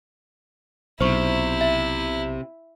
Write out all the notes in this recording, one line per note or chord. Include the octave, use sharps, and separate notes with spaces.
B1 C3 E4 C5 C#6
E5